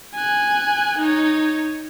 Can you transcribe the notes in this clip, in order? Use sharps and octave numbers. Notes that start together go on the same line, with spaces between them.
G#5 F#6
D#4 C#5